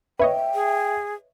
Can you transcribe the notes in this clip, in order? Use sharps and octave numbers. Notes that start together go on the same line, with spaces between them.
B4 C#5 D#5 E5 G5
G#4